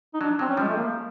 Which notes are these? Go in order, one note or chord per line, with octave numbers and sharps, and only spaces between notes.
D#4
F#3 D4
F#3 C4
C#4
F3 G3 G#3
A3
A#3